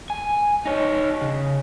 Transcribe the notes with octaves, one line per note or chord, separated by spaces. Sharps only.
G#5
D#4 C#5
C#3